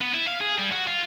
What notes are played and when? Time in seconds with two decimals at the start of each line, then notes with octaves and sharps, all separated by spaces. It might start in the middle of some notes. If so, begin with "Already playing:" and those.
0.01 B3
0.14 E4
0.27 F5
0.40 G#4
0.58 G3
0.72 F#4
0.87 F4